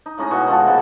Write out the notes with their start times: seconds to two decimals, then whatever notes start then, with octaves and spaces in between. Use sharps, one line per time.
0.06 D#4
0.18 A2 G#3 C#4 A#5
0.31 B2 D#5 F#5 C#6
0.47 D#3 G#3 F4 A4
0.66 C3 G#3 A#3 B3